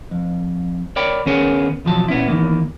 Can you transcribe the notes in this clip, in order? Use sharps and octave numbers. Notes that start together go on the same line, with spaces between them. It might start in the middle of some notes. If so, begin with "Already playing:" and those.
F2
A#4 C#5 D5 G5 B5
D#3 B3 C#4 G#4 A#4 C#5
B1 E2 F3 F#3 A5
A#2 B3 C#4 E4
E2 G2 D#3 E3 A#3